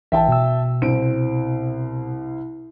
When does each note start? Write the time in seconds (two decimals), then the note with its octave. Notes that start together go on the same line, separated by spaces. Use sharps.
0.12 A#1 E3 E5 G5 A5
0.28 B2 E6
0.82 C2 C4 D7